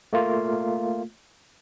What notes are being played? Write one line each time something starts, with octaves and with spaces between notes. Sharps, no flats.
A3 A#3 F4